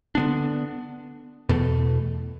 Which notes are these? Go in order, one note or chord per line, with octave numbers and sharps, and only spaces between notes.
D3 F3 B3 D4
E2 B2 A3